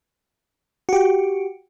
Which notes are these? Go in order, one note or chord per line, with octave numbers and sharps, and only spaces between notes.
F#4 G4